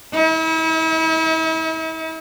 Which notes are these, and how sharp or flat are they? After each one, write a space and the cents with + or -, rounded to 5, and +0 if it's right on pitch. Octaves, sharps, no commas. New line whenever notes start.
E4 -40